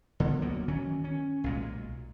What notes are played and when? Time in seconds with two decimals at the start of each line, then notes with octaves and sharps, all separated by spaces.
0.20 D3 B3
0.42 D2 F#3 A#3 B3
0.68 D#3 E3 F#3 C#4
1.04 C#4
1.44 B1 A#2 G#3